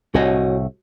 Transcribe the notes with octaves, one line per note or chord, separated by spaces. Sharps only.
C2 A2 F#4 C#5 D#5